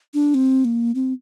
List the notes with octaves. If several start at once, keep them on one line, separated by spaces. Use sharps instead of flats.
D4
C4
A#3
C4